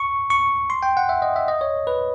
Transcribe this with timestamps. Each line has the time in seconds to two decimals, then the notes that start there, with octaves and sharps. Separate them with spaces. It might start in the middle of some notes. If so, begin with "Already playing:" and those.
Already playing: C#6
0.30 C#6
0.70 C6
0.83 G5
0.97 F#5
1.09 E5
1.22 D#5
1.36 E5
1.48 D#5
1.61 C#5
1.87 B4